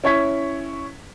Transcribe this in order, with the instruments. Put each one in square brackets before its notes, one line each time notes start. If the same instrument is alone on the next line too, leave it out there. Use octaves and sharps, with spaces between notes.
[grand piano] C#4 E4 C#5 C#6 G#6 B6